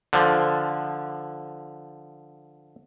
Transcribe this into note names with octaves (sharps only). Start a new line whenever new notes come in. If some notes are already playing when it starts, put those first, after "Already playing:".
D3 F3